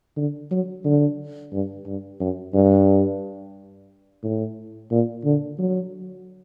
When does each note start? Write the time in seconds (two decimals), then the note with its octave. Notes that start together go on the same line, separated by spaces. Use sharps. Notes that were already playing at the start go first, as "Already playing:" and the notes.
0.17 D3
0.51 F#3
0.85 D3
1.53 G2
1.86 G2
2.20 F#2
2.54 G2
4.23 A2
4.91 A#2
5.25 D3
5.59 F#3